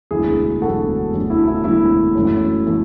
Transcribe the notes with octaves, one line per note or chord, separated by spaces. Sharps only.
E1 D2 D3 F#3 E4 G#4
E1 D2 D3 F#3 F#4 A4
E1 D2 D3 F#3
E4
E4
E1 D2 D3 F#3 E4
F#2 E3 A3 C#4
E3 A3 C#4